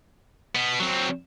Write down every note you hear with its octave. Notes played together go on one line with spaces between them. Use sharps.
B2 B3
F#3 C4